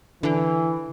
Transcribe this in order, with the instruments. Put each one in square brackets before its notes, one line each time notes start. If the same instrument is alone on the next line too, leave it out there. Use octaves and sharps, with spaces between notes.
[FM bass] D3 [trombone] E3